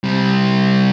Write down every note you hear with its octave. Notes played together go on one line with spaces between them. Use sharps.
C3 G3